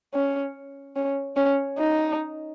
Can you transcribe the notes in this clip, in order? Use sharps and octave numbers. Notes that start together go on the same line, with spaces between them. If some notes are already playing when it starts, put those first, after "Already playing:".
C#4
C#4
C#4
D#4